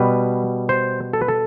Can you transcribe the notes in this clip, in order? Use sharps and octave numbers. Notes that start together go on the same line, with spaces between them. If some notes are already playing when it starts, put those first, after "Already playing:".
Already playing: B2 G3 B4
C5
A4
B4
A4